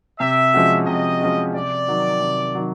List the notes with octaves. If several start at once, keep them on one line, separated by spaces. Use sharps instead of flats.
C3 E5
F3 G#3 C#4 F#4
C3 D#5
F3 G#3 C#4 F#4
C3 D5
D#3 F#3
C3
D#3 F#3